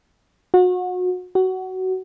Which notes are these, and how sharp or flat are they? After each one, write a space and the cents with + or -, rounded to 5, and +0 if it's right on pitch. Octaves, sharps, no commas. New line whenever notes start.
F#4 -30
F#4 +20